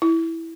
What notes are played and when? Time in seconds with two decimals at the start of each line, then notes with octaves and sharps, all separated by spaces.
0.02 E4